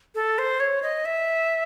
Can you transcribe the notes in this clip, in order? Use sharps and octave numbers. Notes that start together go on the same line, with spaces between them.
A4
C5
C#5
D#5
E5